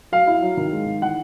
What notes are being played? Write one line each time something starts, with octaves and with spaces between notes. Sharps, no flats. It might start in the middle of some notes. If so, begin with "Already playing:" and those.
F#3 F5
E4
F#3
D#3
G#3
D#3
E3 F#5